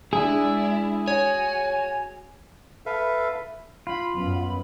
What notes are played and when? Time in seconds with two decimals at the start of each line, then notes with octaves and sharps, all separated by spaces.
0.13 G#3 D4 E4 G#4
1.08 F#4 C#5 G#5
2.86 A4 B4 E5 F5
3.87 F4 B5
4.15 F#2 B3 B5